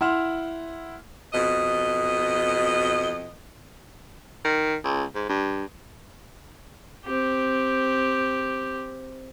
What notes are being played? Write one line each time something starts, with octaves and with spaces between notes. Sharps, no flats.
E4 F#5 C6 F6 E7
F2 B2 D#5
D#3
C#2
G#2
G2
C4 G4